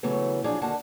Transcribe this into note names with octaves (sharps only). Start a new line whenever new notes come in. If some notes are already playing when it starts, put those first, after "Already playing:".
C#3 E3 F#3 A3 B3
F3 F#3 D4 F4 G#4
D#2 D3 A#3 F#4 F#5 A5